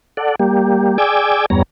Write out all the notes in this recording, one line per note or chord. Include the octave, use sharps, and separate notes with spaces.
A4 D5 F#5
G3 A#3 G4
G#4 D5 G5 G#5 D6 E6
E2 G2 G3 B3 C#5 A#5